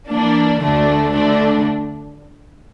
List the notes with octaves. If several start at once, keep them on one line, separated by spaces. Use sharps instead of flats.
E3 A#3 D4
D2 D3 A3 D4
D3 A3 D4